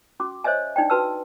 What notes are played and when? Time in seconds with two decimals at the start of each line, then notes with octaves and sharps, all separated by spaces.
0.20 C#4 F#4 D6
0.44 C5 C#5 D#5 E5 G#5
0.76 D4 D#4 D5 G5
0.90 F#4 B4 A5 E6